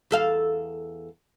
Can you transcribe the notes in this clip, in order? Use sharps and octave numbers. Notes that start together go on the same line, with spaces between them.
E2 A4 F5